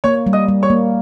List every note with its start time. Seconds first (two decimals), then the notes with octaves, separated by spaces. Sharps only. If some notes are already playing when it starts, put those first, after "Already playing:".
0.04 A#3 C#5 C#6
0.26 G3
0.33 D#5 D#6
0.48 G3
0.63 C#5 C#6
0.70 A#3